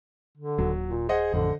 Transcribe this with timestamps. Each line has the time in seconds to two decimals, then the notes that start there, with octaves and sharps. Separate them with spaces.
0.37 D3
0.58 D#1 F#3
0.88 A#2
1.09 G#4 C5 D#5 F#5
1.34 A1 F2 D3